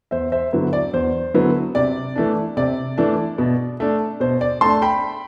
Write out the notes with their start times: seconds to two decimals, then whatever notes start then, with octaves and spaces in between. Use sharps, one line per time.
0.11 E2 C5 E5
0.32 C5 E5
0.53 D3 F#3 B3 E4
0.73 D5
0.93 E2 C5
1.34 D3 F#3 B3 E4
1.75 C3 D5
2.16 E3 A3 D4
2.57 C3 D5
2.98 E3 A3 D4
3.38 B2
3.80 A3 D4
4.20 B2 C5
4.41 D5
4.61 A3 D4 A5 C6
4.82 G5 B5